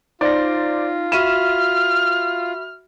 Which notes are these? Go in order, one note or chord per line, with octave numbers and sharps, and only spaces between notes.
D#4 F4 C5 D5 A#6
F#4 E5 B5 F6 D#7 E7